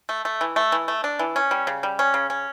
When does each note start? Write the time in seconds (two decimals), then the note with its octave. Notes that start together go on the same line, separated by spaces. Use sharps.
0.09 A3
0.25 A3
0.41 E3
0.56 A3
0.72 E3
0.88 A3
1.04 D4
1.19 E3
1.36 C#4
1.51 G3
1.67 C#3
1.83 G3
1.99 C#4
2.14 C#3
2.30 C#4